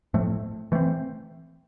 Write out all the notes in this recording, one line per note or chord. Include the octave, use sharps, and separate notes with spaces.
A2 F3 A3
E3 A3 C4